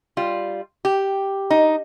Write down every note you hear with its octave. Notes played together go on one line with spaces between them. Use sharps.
G3 F4
G4
D#4